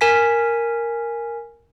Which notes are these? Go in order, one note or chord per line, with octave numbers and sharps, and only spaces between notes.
A#4 G#5 B6